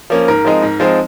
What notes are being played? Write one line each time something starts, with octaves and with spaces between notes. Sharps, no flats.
F3 A#3 C#4
G#2 A#4
F3 G#3 C4 D#4
G#2
F3 G#3 C4 D#4